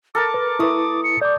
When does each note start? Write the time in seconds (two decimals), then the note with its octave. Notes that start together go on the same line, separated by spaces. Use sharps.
0.15 A4 A#4 A5 D6
0.34 B4
0.59 A3 E4 B4 D#6
1.04 C#7
1.22 D5 D6 G6